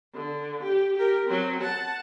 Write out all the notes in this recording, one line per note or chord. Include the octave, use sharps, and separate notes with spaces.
D3
G4
G4 A#4
F#3 C4
F#5 A5